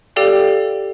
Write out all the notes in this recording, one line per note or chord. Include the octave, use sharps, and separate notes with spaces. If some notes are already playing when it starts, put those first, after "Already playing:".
G4 A4 D5 F5 G5